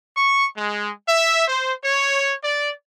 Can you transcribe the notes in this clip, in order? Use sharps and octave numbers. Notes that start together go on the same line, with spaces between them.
C#6
G#3
E5
C5
C#5
D5